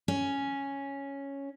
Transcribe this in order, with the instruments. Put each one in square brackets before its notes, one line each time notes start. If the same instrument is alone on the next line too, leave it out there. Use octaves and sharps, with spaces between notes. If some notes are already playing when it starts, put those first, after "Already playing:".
[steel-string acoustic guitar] C#4